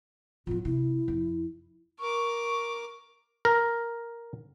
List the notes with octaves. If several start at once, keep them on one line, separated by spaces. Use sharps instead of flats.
A2 F#3 F4
C3 E4
F2
A#4 C#6 D6
A#4